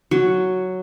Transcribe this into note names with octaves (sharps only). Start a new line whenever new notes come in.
F#3